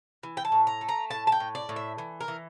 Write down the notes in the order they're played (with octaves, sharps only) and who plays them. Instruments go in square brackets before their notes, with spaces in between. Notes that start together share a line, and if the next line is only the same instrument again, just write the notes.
[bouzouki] E3
G5
A5
A2
A#5
A3
A#5
A2 A5
A5
G5
A2
D5
A2
E5
E3
A#4
E3